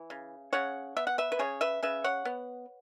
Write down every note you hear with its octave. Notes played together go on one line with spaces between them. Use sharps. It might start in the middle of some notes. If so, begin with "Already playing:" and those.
Already playing: E3
C#3
C#3 C#5 F#5
B3 E5
F#5
B4 E5
B4
C#3 G#4 C#5
B4 E5
C#3 B4 E5
C#5 F#5
B3